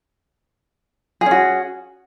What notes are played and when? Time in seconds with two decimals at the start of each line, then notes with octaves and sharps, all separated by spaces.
1.21 G#4
1.26 C#4
1.31 F#4